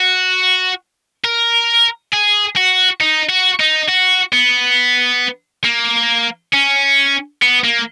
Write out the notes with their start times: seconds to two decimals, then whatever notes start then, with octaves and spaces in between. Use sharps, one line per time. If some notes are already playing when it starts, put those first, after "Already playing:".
Already playing: F#4
1.24 A#4
2.13 G#4
2.56 F#4
3.01 D#4
3.30 F#4
3.60 D#4
3.89 F#4
4.33 B3
5.65 A#3
6.54 C#4
7.42 B3
7.64 A#3